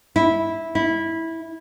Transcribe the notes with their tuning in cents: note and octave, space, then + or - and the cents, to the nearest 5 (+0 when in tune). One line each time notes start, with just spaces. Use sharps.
E4 -10
E4 -15